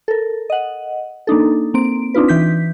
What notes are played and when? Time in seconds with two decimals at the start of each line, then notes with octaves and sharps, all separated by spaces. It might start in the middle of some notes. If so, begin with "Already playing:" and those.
0.08 A4 A#4
0.50 D#5 F#5
1.27 A#3 D4 D#4 A4
1.74 A#3 C4 D7
2.14 C4 D4 D#4 F4 B4
2.28 E3 G6 B6